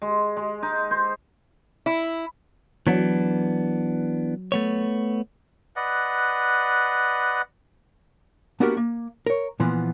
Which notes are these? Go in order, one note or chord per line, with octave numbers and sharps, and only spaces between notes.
G#3
G#3
D#4
C5
E4
E3 F#3 B3 D4
A3 B3 C#5
B4 D5 D#5 F#5
A#3 B3 D4 F#4 G4 A#4
A#3
A#4 C#5
A#2 E3 F3 B3